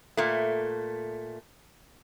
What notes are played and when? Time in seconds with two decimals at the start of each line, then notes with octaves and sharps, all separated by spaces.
0.17 A#2 A3